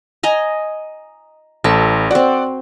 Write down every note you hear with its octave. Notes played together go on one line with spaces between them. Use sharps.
D#5 G#5 A#5
A1 A4
C4 F#4 D5 F#5